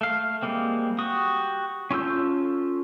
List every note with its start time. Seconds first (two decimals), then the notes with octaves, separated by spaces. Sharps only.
0.01 A3 F5
0.42 G3 G#3 A#3 C4
0.99 F#4 G4 D#6
1.91 C#4 F4 A4 E6 G6